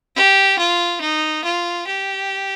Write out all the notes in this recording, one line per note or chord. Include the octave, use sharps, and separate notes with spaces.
G4
F4
D#4
F4
G4